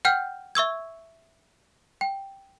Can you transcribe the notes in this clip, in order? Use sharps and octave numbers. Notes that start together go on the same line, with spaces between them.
F#5 G5 F6 G6
E5 C#6 E6 G#6
G5